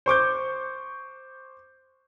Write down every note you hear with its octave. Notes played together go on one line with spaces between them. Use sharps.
C5 C#6 D6 G6